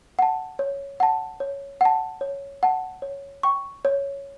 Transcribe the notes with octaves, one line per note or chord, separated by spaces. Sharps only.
F#5 A5
C#5
F#5 A5
C#5
F#5 A5
C#5
F#5 A5
C#5
G5 C#6
C#5